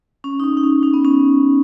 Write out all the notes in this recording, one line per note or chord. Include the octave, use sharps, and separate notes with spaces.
C#4
D#4
C#4
D#4
C#4
C#4
B3
C#4